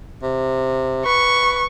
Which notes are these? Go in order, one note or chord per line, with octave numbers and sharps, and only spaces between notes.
C3
B4 C#6